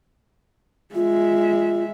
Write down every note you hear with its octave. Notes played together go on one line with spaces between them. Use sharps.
G#3 F4 E5